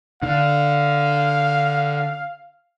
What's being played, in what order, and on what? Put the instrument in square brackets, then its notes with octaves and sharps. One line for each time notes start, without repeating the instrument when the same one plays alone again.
[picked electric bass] D3 [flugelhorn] F5